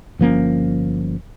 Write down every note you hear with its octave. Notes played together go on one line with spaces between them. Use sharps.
G1 F3 A#3 C#4